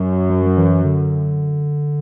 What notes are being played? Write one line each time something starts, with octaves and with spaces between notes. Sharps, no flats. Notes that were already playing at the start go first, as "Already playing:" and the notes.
Already playing: F#2
F#3
F#3
E3
D3